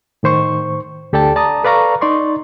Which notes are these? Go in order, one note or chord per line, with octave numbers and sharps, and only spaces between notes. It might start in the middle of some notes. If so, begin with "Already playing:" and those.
A2 D#3 C5 C#6
D2 G4 A4 D5 G5 A5
D5 A5 A#5 D#6
A4 B4 D5 F5 A#5 C#6
D#4 D5 C6 C#6